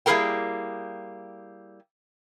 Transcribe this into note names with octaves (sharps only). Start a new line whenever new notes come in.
G3 A#3 E4 G#4 A#4 G5